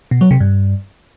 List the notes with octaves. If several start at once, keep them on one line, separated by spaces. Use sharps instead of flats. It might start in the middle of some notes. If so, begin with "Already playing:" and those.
B2
F#3
C3
G2